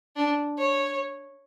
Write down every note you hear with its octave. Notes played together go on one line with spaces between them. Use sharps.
D4
C#5